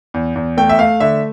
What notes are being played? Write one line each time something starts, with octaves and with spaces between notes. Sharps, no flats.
E2
E2
A3 G5
E5
A3 F5
D3 E5